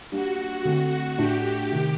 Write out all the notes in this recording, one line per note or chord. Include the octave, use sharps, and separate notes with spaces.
G3 A#3 D4 F#4 G4
D3 A3 C4
A2 A3 D4 F#4 G4
C3 D#3 A3